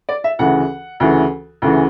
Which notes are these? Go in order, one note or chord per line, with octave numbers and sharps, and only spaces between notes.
D5
E5
D2 C#3 E3 F#5
D2 C#3 E3
D2 C#3 E3